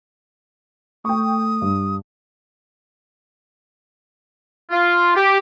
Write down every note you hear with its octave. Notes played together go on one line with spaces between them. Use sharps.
A3 G5 C#6 D#6
G2
F4
G4